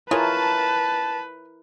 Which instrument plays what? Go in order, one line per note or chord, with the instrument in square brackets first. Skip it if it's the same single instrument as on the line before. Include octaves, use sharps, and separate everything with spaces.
[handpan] E4 A#4 [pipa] F4 G#4 C#5 [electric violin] B4 [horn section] A5